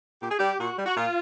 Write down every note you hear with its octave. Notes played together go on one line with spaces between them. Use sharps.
A#2 G4
G#4
G3 G4
A#2 F#4
G3
F#4
A#2 F4